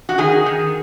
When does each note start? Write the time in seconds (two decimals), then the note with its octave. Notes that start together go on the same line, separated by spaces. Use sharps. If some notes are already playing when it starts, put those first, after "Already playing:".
0.09 F#4
0.18 D#3 G#4
0.46 D#3